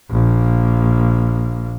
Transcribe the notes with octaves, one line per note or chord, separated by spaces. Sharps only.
A#1 A#3